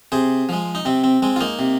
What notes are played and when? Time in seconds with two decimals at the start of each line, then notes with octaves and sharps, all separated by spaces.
0.12 C3 G#4 C5
0.49 F3 G#3
0.75 D#4
0.85 C3 C4
1.04 C4
1.22 G#3 C4
1.36 F4
1.41 A#3 D#4
1.59 C3